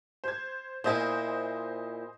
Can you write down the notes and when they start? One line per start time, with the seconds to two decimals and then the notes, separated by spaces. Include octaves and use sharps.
0.24 C5 G#6
0.84 A#2 E4 C5 D#5 G#5